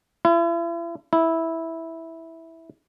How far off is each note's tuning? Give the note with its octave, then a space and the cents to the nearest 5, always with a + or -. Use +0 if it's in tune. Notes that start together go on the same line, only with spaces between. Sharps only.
E4 +40
E4 -10